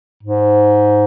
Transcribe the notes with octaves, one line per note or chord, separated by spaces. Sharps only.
G#2